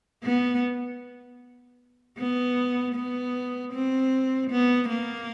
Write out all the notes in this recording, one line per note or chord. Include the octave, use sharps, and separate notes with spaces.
B3
B3
B3
C4
B3
A#3